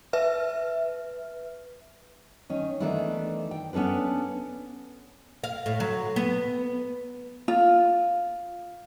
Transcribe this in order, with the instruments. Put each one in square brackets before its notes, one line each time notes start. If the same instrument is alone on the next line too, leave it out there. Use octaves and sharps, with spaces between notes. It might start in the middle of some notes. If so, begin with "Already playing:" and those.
[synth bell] B4 E5 F6
[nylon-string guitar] D#3 C#4
D#3 E3 A3 B3 D4 E4
G5
B3 C#4 D4 A4 B4
[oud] F5
A2
F#3
B3
[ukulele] F4